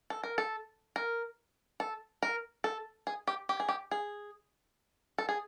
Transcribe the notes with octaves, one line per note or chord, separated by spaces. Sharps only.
A4
A#4
A4
A#4
A4
A#4
A4
G#4
G4
G4
G#4
G4
G#4
A4
G#4